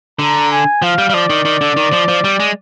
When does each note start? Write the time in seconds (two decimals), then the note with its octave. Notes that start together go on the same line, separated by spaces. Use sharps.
0.19 D3 A#5
0.51 G#5
0.82 F3 F5
0.98 G3
1.10 G3
1.14 F3 D5
1.30 D#3
1.45 D#3
1.61 D3
1.77 D#3
1.92 F3
2.08 F3
2.24 G3
2.40 G#3